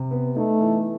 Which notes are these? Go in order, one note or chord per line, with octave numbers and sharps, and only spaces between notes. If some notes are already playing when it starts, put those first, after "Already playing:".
Already playing: C3
B3
A3 D#4
E3